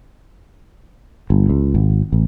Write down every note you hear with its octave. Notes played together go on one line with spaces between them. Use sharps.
G1
C#2
G#1
A1